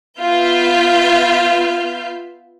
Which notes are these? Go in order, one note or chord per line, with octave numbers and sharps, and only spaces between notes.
B3 F4 E5 F5 F6 G6